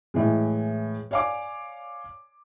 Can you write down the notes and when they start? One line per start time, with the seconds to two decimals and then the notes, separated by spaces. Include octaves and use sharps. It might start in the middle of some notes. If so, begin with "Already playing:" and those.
0.14 A2 E3 G#3
1.11 C#5 D5 F5 G#5 D6